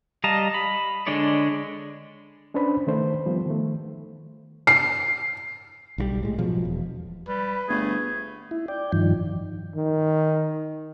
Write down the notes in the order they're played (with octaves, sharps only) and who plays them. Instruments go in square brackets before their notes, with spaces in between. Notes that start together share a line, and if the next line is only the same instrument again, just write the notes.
[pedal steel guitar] G3 D#5 F5 A5 A#5
B5
D3 G#3 D4 C#5 D5
[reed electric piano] C#4 D4 B4 C5 B5
D#3 A3 C5
F3 G3 B3
D#3 A3
[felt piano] C7
[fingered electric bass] B1 E3 G3
A2 G#3
B2 F3 F#3 G#3
E1
[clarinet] G3 [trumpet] B4
[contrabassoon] G1 [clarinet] A3 [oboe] G#4
[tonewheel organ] E4
D5 G5
G2 D#3 F3
[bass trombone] D#3